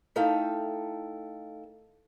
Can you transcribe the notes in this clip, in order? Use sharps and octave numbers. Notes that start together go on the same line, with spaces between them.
A3 D#4 E4 A4 F5 G5